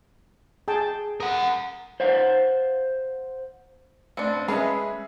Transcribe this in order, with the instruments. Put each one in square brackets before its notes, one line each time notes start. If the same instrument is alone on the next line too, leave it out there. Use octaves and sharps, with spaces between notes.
[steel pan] G#4 G5 A5
[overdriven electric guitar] A#4 F#5 [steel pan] D#6
[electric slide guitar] C5 F5 F#5
[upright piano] A1 C#7 [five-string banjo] C4 D4
[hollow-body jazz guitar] G#3 C#4 [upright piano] G#4 E5 [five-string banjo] B4 D#5